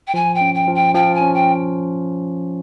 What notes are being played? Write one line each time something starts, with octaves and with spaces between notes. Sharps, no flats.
G5
F3 G#5
G5
C#4
G5
F3
G5
F3 G5
G#5
C#4
G5